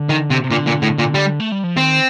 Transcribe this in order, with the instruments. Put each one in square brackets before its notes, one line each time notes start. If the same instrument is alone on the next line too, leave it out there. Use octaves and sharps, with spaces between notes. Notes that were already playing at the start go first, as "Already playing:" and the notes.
Already playing: [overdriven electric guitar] D3
[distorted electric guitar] D#3
C3
[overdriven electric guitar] C3
[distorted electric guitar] A#2 [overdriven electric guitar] D3
[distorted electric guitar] A#2
A2
A#2
G3
[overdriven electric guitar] A3
G3
F3
[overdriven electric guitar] D#3 [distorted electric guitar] C4